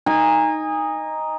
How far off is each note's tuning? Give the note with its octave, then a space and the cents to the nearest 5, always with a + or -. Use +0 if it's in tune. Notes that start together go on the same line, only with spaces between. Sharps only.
D#4 +0 G#5 -30